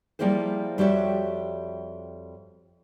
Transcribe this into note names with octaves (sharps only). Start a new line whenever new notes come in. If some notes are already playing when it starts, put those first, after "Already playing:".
F3 G3 A#3 E4 G#4 C5
F2 G3 F#4 G4 C#5 E5